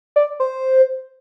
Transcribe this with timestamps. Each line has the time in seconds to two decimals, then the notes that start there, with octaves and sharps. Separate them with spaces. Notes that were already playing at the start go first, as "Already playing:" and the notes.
0.16 D5
0.40 C5